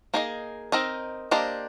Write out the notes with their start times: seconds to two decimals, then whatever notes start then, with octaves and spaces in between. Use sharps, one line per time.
0.14 A#3 D#4 G#4 D#5
0.72 C4 D#4 A#4 D#5
1.31 A#3 D4 G4 C5 D#5